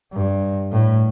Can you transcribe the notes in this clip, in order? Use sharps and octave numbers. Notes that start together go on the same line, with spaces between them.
G2
A2